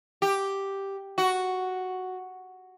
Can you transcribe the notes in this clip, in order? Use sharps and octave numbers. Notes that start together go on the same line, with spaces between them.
G4
F#4